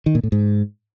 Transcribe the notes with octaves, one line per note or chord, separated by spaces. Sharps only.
D#3
A#2
A2
G#2